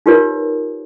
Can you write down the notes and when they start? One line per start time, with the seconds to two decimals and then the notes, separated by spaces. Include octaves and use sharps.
0.06 D#4 F4 G4 A#4 B4 C#5